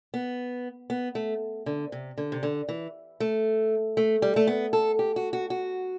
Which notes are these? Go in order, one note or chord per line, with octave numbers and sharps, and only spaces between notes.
B3
B3
A3
D3
C3
D3
C3
D3
E3
A3
A3
G3
A3
B3
A4
G4
F#4
F#4
F#4